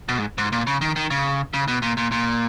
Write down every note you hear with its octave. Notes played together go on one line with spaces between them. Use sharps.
B2
G#2
G#2
A#2
C#3
D#3
D#3
C#3
C#3
B2
A#2
A#2
A#2